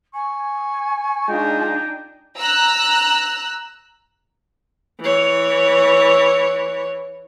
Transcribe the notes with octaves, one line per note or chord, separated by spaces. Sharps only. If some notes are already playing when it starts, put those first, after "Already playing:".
G#5 C#6
G#3 D4 D#4 F4 G5
A#5 E6 F#6
E3 C#5